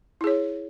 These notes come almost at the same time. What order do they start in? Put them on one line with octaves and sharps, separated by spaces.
E4 G#4 C#5